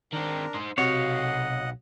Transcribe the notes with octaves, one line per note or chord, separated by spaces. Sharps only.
D#3 C4 D4 A#4
D#4 C5
B1 C3 F#4 C#5 D#5 F5 F#5